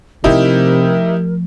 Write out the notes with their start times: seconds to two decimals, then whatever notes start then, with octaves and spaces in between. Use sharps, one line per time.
0.24 C3 F3 A3 D#4 E4 G4 A#4